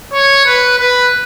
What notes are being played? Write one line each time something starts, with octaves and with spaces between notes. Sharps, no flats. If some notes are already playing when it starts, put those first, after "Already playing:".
C#5
B4
B4